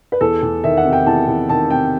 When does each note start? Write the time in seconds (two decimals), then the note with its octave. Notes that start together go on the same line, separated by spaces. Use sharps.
0.12 B4
0.21 E2 A4
0.43 E2
0.64 D#3 E5
0.77 F#5
0.85 C3
0.93 G5
1.07 E2 A5
1.28 E2
1.49 D#3 A5
1.70 C3 G5